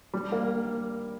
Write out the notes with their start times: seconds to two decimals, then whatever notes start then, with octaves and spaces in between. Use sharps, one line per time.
0.14 G3
0.32 A#3